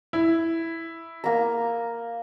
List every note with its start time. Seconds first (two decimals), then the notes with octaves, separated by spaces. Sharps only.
0.13 E4
1.24 A#3 A#5